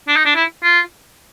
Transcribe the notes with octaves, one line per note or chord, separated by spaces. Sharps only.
D4
D#4
D4
E4
F4